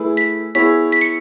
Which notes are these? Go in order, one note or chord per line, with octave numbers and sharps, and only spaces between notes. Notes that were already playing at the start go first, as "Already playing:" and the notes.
Already playing: A3 E4 G#4 B4
B6
B3 E4 G#4 C#5 B6
B6
C#7